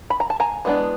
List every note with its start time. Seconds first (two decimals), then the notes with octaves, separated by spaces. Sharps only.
0.10 B5
0.20 A#5
0.30 A5
0.40 G#5 A#5
0.65 E3 G#3 B3 D4